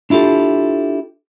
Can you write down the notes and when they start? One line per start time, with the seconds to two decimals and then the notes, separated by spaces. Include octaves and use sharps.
0.10 D4 E4 F4 G4 A4